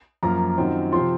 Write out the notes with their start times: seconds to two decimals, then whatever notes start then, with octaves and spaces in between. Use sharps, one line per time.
0.23 F#2 F3 A#3 F4 A#5
0.58 F#2 D#3 F#3 C4 F4
0.92 C3 F3 C4 F4 C6